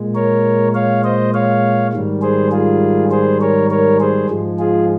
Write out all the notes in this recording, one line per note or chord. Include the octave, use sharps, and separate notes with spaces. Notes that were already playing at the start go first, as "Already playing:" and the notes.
Already playing: A#2 G#3
A#4 C#5
C#5 F5
C5 D#5
C#5 F5
G#2 D#3 G3
G#4 C5
F4 G#4
G#4 C5
A#4 C#5
A#4 C#5
G#4 C5
G#2 F3 G#3
F4 G#4